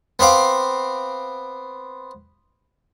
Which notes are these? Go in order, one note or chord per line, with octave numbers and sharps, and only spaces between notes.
B3 C4 F5 D6